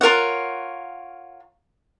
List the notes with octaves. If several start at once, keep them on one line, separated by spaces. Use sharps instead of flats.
F4 A#4 C#5 F#5